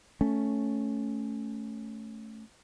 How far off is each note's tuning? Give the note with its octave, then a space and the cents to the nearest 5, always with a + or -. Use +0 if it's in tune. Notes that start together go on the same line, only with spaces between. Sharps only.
A3 +0 C#4 +0